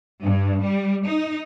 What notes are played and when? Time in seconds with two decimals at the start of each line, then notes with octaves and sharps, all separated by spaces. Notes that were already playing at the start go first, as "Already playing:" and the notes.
0.24 G2
0.63 G3
1.07 D#4